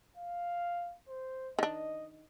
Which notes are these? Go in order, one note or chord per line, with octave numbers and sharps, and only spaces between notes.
F5
C5
D#3 D4 D#5